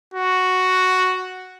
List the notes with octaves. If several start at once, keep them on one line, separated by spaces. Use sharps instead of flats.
F#4